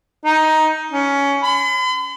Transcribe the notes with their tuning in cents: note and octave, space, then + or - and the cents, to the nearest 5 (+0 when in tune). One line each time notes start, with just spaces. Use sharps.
D#4 +10
C#4 +15
B5 +45